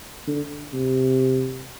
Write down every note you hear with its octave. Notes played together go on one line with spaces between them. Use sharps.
D3
C3